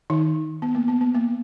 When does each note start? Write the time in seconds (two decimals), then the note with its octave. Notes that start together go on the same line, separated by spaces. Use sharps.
0.10 D#3 D#4
0.62 B3
0.75 A#3
0.88 B3
1.01 B3
1.15 A#3